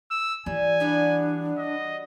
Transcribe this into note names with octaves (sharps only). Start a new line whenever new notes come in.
E6
E3 G3 G#5
G3 B3 D4 F#4
D#5